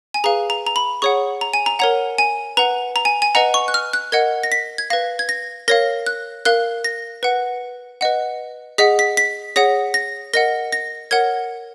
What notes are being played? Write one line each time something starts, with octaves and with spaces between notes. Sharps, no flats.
G#5
G#4 B4 F5 A#5
A#5
A#5
B5
G#4 C#5 F#5 C#6
A#5
G#5
A#5
A#4 C#5 F#5 A#5
G#5
B4 F#5 A#5
A#5
G#5
G#5
B4 D#5 F#5 A#5
C#6
F#6
F6
F#6
A#4 D#5 F#5 G#6
A#6
B6
G#6
B4 F5 A#6
G#6
A#6
A#4 C#5 F5 A#6
F#6
A#4 F5 F#6
A#6
B4 F#5
B4 D#5 F#5
G#4 D#5 F#5 B6
B6
B6
G#4 C#5 F#5 A#6
A#6
A#4 D#5 F#5 A#6
A#6
A#4 C#5 F#5 G#6